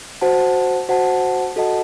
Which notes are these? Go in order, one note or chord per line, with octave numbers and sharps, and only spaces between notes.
F#4 C5 F#5 A5
F#4 C5 F#5 A5
F#4 A4 D#5 F#5 A5